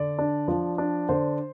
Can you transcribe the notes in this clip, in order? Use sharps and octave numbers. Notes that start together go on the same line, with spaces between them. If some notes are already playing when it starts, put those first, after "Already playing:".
Already playing: D3 D5
D4
F3
D4
D3 C5